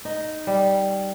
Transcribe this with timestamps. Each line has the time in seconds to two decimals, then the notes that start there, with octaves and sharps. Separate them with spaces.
0.05 D#4
0.47 G3